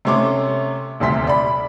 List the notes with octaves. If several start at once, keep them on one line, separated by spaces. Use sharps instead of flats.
C3 A3 C#4 C6 D6
D#1 D2 C3 C6 B6
D5 B5